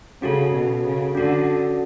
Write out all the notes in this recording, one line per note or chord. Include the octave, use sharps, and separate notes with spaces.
C#3 C#4 F#4 A4
B2
C#3
D3 C#4 F#4 A4